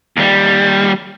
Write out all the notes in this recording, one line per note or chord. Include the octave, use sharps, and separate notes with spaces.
D#2 G3